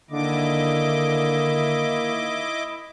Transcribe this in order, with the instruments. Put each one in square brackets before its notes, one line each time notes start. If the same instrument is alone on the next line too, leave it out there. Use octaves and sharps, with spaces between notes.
[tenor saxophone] D3 [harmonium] D#3 A#3 [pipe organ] E4 D#5 D6